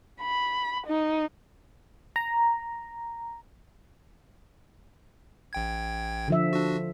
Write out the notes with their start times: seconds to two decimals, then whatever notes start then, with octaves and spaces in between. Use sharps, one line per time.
0.21 B5
0.87 D#4
2.16 A#5
5.53 A1 G5 G#6
6.28 D3 F3 E5
6.53 D4 F#4